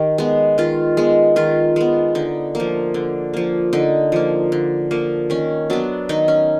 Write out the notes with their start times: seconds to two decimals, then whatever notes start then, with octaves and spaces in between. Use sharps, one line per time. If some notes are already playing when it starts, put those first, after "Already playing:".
Already playing: D#3 G4
0.18 G#3 B3
0.58 D#3 F4
0.97 G#3 B3
1.36 D#3 F4
1.76 G#3 B3
2.15 D3 D#4
2.55 F3 A#3
2.94 D3
3.34 F3 A#3
3.73 D3 D#4
4.12 F3 A#3
4.52 D3
4.91 F3 A#3
5.30 D#3 C#4
5.70 F#3 B3 D4
6.09 D#3 D#4
6.28 C#4